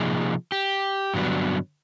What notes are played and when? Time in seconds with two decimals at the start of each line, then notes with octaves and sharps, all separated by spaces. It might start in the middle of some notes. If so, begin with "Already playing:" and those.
Already playing: C3 F3 A#3 D#4 G#4
0.52 G4
1.14 G2 D3 F#3 B3 D4